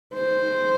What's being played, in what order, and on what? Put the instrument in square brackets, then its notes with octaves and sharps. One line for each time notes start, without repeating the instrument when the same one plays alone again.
[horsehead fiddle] C5